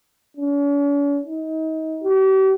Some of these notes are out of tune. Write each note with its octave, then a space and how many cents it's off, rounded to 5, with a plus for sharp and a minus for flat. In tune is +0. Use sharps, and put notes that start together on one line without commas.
C#4 +45
D#4 +30
G4 -40